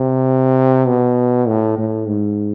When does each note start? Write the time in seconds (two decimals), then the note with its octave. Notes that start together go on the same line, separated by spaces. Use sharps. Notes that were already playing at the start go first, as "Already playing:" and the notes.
Already playing: C3
0.87 B2
1.48 A2
1.78 A2
2.08 G#2